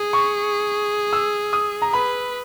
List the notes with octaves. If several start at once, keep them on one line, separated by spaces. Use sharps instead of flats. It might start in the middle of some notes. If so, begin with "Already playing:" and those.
Already playing: G#4
C#6
E6
D#6
A#5
B4 B5